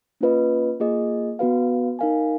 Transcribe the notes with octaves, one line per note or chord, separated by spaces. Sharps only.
A#3 C#4 F4 B4 D#5
A#3 F4 G#4 D#5
B3 F#4 B4 F5
D#4 A#4 F5 G#5